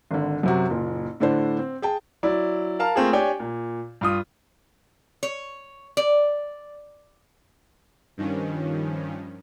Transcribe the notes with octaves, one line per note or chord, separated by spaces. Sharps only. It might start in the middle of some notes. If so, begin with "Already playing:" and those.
G#1 D3
F#2 C3 F#4
F#1 A#2
A2 D3 D4 C5
C4
G#4 G5 A5
F#3 E4 D5
A#4 F5 A5
A3 A#3 C4 F4 G#4
D4 G4 C#5 G5 G#5
A#2
G2 F4 D#6
C#5
D5
G2 D#3 F3 C#4